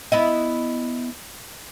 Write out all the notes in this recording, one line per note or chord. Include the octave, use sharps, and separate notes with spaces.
B3 E4 D#5